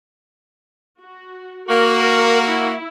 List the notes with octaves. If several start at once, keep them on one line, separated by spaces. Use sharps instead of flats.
F#4
A#3 F#4 A#4
E4